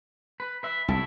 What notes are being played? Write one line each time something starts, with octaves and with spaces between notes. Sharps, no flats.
B4
B4 E5
C2 E4 A4 E5